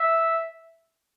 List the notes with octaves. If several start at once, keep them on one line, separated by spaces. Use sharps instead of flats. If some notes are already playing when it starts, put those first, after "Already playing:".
Already playing: E5